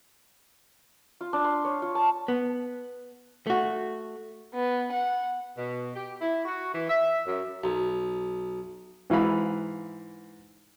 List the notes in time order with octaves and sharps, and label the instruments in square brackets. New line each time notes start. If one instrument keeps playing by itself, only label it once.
[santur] F4
D4
C6
C#5
F4
A5
[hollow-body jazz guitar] B3
A3 F#4
[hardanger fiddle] B3
F#5
[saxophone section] B2
G4
E4
F#4
E3
E5
F#2
[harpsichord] B1
[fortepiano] G#2 E3 F5 B5